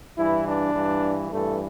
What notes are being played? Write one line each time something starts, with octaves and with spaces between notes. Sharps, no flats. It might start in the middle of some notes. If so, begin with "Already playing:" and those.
G2 E3 E4
D4
G2 E3
G2 E3 A3